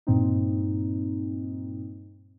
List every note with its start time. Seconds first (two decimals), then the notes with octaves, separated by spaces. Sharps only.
0.07 G2 A#2 C4 D#4